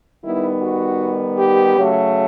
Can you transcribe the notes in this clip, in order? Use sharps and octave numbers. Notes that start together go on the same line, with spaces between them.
D#3 G3 B3 D#4 E4
F#4
G4
C#3 F#3 A3